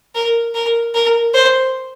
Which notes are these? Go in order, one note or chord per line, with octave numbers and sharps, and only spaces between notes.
A#4
A#4
A#4
C5